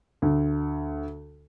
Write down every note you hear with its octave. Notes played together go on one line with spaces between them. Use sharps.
D2